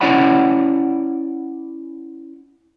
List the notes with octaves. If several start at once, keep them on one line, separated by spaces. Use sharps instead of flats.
C#4 E4 C#5 D5 F#5 B5